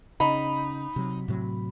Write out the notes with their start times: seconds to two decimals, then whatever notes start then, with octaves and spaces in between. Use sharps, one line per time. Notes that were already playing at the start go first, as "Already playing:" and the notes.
0.20 C#3 D#4 B5
0.96 C3 F#3
1.28 A2 C3 F#3